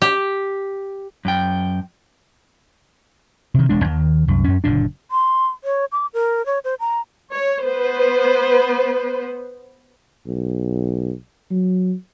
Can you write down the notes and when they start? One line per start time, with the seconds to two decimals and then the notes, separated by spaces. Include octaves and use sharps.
0.02 G4
1.25 F#2 G5
3.54 C3 D#3
3.69 E1 G#3 D4
3.85 D#2 D#3
4.28 C2 F#2
4.44 F#2 C#4
4.64 F#1 A#2 D3 D4
5.11 C6
5.64 C#5
5.92 D6
6.14 A#4
6.46 C#5
6.64 C5
6.80 A#5
7.31 C#5
7.64 B3 B4 C5
10.26 B1
11.51 F#3